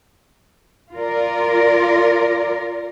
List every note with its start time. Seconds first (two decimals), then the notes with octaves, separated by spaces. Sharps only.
0.94 F4 A#4 D5